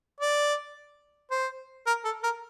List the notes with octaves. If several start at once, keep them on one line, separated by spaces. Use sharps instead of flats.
D5
C5
A#4
A4
A#4